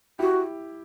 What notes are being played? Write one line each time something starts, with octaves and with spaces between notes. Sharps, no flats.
E4 F#4 G4